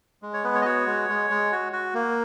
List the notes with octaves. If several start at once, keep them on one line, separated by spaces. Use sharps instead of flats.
G#3
C#5
B3 B4
C#5
D#5
F#4 C#5
G#3
G#3
G#3
F#4
F#4
A#3